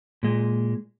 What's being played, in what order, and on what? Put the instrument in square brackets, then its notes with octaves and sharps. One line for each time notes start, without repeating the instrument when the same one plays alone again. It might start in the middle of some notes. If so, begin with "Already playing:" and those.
[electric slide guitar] A#2 G#3